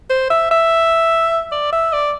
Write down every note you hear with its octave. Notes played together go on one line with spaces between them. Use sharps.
C5
E5
E5
D5
E5
D5